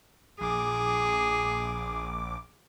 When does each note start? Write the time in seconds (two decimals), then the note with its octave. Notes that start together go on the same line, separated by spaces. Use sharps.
0.41 A#1 G#4 D6